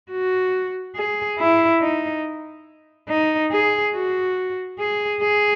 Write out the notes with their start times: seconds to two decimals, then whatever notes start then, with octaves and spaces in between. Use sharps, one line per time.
0.11 F#4
0.96 G#4
1.39 E4
1.81 D#4
3.09 D#4
3.52 G#4
3.94 F#4
4.79 G#4
5.22 G#4